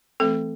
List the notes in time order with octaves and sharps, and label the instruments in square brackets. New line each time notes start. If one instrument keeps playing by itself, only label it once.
[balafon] E3 A3 C4 A4